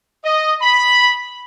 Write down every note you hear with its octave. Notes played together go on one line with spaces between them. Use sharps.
D#5
B5